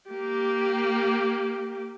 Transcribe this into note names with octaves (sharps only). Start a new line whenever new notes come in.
A#3 G4